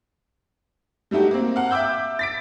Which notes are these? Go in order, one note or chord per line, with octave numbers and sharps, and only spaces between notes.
G3 A3 D#4 F#4 G4
A#3 C4
F5 F#5
E5 G5 D6 E6 G6
A6 B6 D7